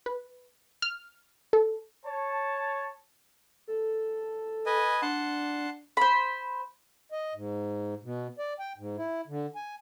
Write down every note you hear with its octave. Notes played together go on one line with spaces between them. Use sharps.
B4
F6
A4
C#5 A5
A4
B4 D#5 G#5
D4 F#5 A5 C6
C5 B5
D#5
G#2
B2
D5
G5
G#2
E4
D3
G#5